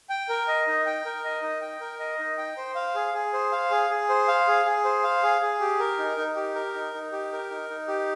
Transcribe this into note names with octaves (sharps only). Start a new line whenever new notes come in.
G5
A#4
D#5
D#4
G5
A#4
D#5
D#4
G5
A#4
D#5
D#4
G5
C5
F5
G#4
G#4
C5
F5
G#4
G#4
C5
F5
G#4
G#4
C5
F5
G#4
G#4
G4
A#4
D#4
D#4
G4
A#4
D#4
D#4
G4
A#4
D#4
D#4
G4